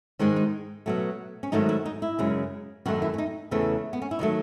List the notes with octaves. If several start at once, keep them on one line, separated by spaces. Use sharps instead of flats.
G#2 D#3 G#3 C#4
D#4
B2 F#3 A3
C#4
G#2 D#3 F#3 A3 D#4
E4
D#4
E4
F#2 C#3 G#3
F#2 D#3 A3 F#4
E4
C#4
D#4
E2 C#3 E3 A3
B3
C#4
E4
D#3 F#3 A3 D#4